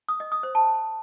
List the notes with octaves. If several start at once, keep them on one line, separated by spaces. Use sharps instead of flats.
D#6
D#5
D#6
C5
A5